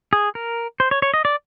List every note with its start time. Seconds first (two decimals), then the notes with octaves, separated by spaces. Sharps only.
0.13 G#4
0.35 A#4
0.80 C5
0.91 C#5
1.02 C#5
1.14 D#5
1.25 D5